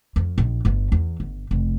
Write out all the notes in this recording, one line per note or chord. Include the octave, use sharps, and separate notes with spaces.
F2
A#1
G1 G2
E2
G1
F1